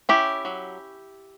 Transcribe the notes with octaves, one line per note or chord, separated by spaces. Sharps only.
C#4 E4 G4
F#3